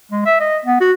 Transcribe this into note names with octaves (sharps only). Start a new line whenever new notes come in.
G#3
E5
D#5
B3
F#4